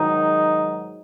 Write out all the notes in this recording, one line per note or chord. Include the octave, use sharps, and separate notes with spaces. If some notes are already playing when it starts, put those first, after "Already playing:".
Already playing: G#2 D#3 F#3 D#4